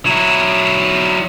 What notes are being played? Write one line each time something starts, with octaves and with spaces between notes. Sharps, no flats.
F#3 E4